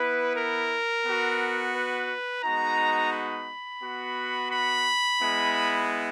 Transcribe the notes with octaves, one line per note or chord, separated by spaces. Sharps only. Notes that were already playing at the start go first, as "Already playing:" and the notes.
Already playing: B3 E4 B4
A#4
B3 F#4
B4
G#3 B3 D#4 F#4 A#5
B5
B3 F#4
B5
G#3 B3 E4